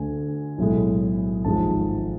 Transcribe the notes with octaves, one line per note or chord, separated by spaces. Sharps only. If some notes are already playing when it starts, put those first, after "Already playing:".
Already playing: D2 D3 A3 G#5
B1 A2 G#3
G#1 G#2 F3 G#3 A5